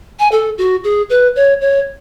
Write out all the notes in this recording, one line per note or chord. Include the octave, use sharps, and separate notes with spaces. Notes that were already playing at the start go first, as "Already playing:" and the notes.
G#5
A4
F#4
G#4
B4
C#5
C#5